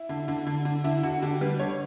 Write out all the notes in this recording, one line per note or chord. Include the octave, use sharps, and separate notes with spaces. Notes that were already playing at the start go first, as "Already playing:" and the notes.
Already playing: E4
D3
D3
D3
D3
D3 E4
D3 F#4
D3 G4
G3 B4
D3 C#5